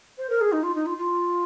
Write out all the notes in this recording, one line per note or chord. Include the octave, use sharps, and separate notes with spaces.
C5
A#4
G#4
D#4
F4
D#4
F4
F4